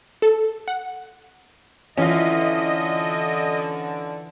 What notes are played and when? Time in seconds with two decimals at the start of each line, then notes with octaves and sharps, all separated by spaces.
0.22 A4
0.68 F#5
1.97 D3 E3 C#4 F4 D#5